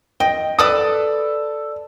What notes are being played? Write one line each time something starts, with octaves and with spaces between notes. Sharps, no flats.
D#5 G5
A4 B4 D5 D#6